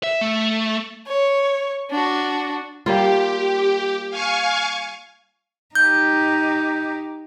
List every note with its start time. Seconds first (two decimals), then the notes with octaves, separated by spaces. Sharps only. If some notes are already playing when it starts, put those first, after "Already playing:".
0.03 E5
0.21 A3
1.07 C#5
1.91 D4 F#4
2.86 G3 A#3 F4 G4
4.10 F5 G#5 C#6
5.75 D#4 G4 G6